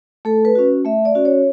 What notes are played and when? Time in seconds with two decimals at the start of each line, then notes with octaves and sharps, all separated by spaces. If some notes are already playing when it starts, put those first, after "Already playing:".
0.25 A3 A4
0.45 B4
0.55 C#4 F#4
0.85 A3 E5
1.05 D5
1.15 C#4 F#4
1.25 C#5